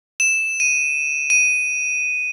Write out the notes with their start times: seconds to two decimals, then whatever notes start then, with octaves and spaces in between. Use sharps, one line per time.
0.20 E7
0.60 D#7
1.30 D#7